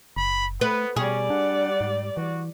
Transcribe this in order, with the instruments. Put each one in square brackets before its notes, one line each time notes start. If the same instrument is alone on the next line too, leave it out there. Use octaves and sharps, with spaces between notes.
[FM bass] F#1 [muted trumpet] B5
[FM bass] A3 [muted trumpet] B3 [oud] B4
[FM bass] B2 [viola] G3 D5 [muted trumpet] C#4 [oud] G#4
[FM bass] D4 [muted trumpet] F#5
[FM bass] G#2
[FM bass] E3 [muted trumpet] F#4